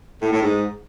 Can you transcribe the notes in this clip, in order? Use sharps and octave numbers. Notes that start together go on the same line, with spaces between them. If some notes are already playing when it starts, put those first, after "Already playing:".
A2
A2
G#2